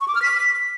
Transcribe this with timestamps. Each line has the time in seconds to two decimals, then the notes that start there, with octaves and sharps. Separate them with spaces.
0.01 C#6
0.08 D6
0.15 F6
0.22 B6